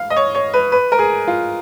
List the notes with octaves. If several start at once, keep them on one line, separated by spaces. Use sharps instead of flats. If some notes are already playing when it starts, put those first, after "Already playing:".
Already playing: F5
D#5
C#5
C#5
B4
B4
A#4
G#4
F4